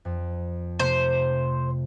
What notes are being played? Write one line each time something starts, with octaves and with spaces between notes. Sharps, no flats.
F2
C3 A3 C5